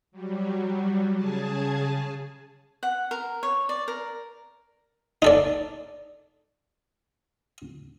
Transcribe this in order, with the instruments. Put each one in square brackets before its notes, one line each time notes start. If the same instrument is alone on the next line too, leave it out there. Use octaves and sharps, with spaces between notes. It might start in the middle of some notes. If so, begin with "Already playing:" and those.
[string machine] F#3 G3
C#3 G#4 G#5 A5
[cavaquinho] F#5
A#4
C#5
D5
A#4
[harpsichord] D#4 A4 D5